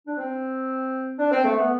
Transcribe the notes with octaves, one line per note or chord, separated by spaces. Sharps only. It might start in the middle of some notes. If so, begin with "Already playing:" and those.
D4
C4
D4
C4
A3
B3